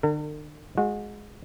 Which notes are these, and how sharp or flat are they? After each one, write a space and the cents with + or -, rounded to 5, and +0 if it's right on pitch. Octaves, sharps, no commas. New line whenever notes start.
D3 +40 A#4 -45
G#3 +0 F#4 -30